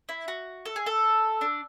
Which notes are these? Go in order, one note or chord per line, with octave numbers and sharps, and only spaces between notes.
E4
F#4
A4
G#4
A4
D4